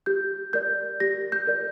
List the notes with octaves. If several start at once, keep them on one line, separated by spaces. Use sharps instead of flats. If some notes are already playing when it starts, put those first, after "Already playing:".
G4 G6
A#4 D5 G6
G4 A#6
G6
A#4 D5